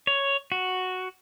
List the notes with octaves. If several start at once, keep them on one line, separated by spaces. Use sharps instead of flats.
C#5
F#4